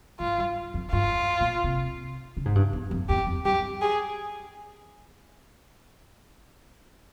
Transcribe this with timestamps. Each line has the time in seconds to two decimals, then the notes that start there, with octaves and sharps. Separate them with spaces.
0.20 G#2 F4
0.38 G2
0.74 F2
0.92 G2 F4
1.40 A#2
1.64 C3
2.37 C#3
2.45 G#2
2.55 G2
2.73 E2
2.91 F2
3.09 E2 G4
3.27 F2
3.45 G2 G4
3.82 G#4